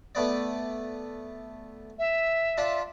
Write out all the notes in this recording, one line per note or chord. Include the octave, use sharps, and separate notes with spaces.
A3 B3 D5
E5
D4 F4